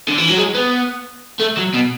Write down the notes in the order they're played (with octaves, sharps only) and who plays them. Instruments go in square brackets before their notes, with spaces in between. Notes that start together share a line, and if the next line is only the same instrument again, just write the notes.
[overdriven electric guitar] D3
E3
F#3
G#3
B3
A3
F#3
B2